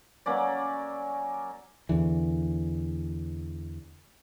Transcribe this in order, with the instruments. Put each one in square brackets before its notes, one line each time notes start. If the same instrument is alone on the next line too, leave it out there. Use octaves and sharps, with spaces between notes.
[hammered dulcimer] F#3 A#3 C#4 D5
[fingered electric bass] E2 D3 E3